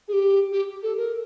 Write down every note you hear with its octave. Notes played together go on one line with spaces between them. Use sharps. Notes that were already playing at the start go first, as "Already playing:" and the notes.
G#4
G4
G4
A4
A#4